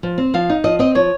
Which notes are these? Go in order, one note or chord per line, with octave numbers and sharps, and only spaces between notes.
F3
C4
F3 F5
D#4
F3 D#5
C4 D#5
F3 C#5